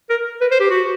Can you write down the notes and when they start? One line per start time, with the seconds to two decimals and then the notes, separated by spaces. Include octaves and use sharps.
0.10 A#4
0.41 B4
0.51 C5
0.60 G4
0.70 F#4